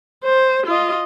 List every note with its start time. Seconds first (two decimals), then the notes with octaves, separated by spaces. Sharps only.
0.24 C5
0.67 F4 D#5